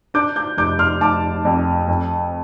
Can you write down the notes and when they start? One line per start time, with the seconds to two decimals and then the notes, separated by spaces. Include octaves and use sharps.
0.14 D4 D6 G6
0.36 D6 G6
0.57 F1 D6 G6
0.79 C6 F6
1.01 F1 A5 D6
1.45 F2
1.88 F2